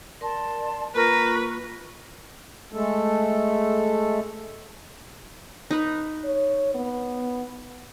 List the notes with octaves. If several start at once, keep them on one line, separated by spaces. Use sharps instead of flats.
A#4 D5 A5 C6
A#3 F4 A#4 B4 C#6
G#3 A3 A4
D#4 B4
C#5
B3